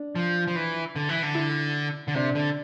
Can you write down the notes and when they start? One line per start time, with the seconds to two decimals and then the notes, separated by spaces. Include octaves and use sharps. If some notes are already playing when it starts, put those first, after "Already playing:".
Already playing: D4
0.15 F3
0.47 F3
0.56 E3
0.96 D3
1.09 E3
1.23 D3
1.35 E4
2.08 D3
2.15 C3 D4
2.35 D3